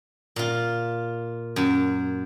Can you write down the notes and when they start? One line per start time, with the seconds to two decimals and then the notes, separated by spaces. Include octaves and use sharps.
0.36 A#2 F4
1.56 F#2